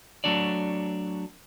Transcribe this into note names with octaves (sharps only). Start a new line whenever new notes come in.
F#3 A3 D4 F#4 D5